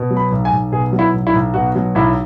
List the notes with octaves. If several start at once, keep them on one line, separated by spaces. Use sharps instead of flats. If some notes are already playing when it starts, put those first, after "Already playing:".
Already playing: B2
F#3
B5
B1
G#5
B1
B2 G#4
F#3
E4
B1
E4
B1
B2 F#4
F#3
B1 E4